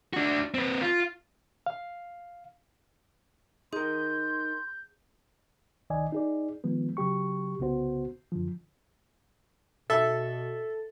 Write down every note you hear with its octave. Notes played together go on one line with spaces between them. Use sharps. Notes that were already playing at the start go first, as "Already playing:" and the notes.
D4 F#4
C4 B4
F4
F5
D#4 G#4 A#4 C6 G6
C2 D#3 D5 D#5 G#5
D#4 G#4 D5
D#3 F3 G#3 B3
C#3 F#3 G4 C#6
C2 C#3 B3 F#4 C5
F#2 D3 F3
B2 A4 E5